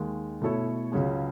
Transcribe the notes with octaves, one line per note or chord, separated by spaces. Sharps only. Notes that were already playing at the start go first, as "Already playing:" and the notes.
Already playing: D#2 D#3 G#3
B2 A3 E4 A4 C#5
C#2 C#3 F#3 C#4 G#4